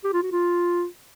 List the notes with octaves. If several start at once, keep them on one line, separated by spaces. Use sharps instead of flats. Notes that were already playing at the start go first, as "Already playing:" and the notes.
G4
F4
F#4
F4